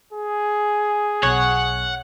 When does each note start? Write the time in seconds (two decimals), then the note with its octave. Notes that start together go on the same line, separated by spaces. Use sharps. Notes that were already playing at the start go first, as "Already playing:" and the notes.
0.13 G#4
1.23 B1 B2 C#5 F#5